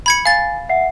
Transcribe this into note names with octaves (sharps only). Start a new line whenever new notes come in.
B5 G#6 C#7
F5 G#5 A6
E5 F#5 C7